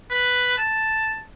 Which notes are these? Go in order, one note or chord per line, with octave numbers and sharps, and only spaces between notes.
B4
A5